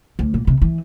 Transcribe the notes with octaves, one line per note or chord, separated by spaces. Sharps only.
D2
A#2
C3
E3